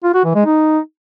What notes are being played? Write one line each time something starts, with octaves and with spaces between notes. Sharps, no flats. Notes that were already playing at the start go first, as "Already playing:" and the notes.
F4
F#4
E3
G#3
D#4